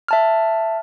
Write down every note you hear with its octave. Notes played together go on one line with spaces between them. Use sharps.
E5 A5 F6